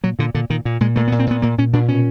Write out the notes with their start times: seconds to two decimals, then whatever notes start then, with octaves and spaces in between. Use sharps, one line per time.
0.03 A#2 F#3
0.19 A#2 D3
0.35 A#2 D3
0.50 A#2 D#3
0.65 A#2
0.80 A#2 G#3
0.96 A#2 A3
1.08 B3
1.12 A#2
1.19 C4
1.27 A#2 B3
1.42 A#2 A#3
1.58 A#2 C#4
1.73 A#2 D4
1.88 B2 C#4